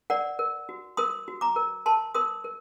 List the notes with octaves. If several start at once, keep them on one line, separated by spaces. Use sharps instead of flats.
A#4 D5 F#5
A#4
F#4
A#4 C6 D#6
F#4
A#5 D6
A#4
A#4 A5 C6
A#4 C6 D#6
A#4